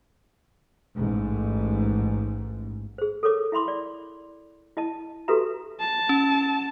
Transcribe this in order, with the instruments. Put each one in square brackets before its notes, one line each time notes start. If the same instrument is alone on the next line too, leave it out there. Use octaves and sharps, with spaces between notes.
[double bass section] A1 G#2
[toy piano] G#4 C5
A4 A#4 C#5 D6
E4 E5 B5 C6 D6
D5
E4 D#5 A5
F#4 G4 A4 B4 E5 A#5
[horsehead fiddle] A5
[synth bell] C#4